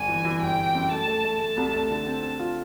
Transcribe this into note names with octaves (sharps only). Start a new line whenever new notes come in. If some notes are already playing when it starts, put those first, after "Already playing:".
Already playing: G1 G#5
E3
E3
G1 G5
G1
F#2
A3 A5
A3
A3
A3 A5
C2
A3
D3 A5
C4
C4
F4